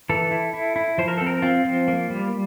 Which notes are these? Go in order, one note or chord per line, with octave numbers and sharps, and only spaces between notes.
E3 A4
E4
E4
E4
F3 C5
A#4
C4 A4
A#4
C4 F4
F3
A#3
G3